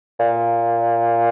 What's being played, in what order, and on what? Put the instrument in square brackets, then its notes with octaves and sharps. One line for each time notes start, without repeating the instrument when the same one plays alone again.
[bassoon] A#2